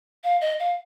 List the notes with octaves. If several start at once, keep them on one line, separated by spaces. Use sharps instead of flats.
F5
D#5
F5